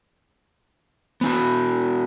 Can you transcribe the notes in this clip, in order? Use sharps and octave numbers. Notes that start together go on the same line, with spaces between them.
B3 E4 F#4